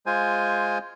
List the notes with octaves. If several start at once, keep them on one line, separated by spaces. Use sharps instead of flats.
G#3 F4 C5 G#5